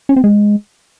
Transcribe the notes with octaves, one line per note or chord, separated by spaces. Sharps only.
C#4
C4
G#3